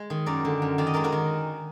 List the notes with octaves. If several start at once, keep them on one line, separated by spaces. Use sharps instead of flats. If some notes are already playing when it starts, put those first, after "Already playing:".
Already playing: G#3
D#3
F#2 A#4 D5
D3
F#2
D#3 D5
D#5
G#3 A#4 D5
F#4 A#4
D#3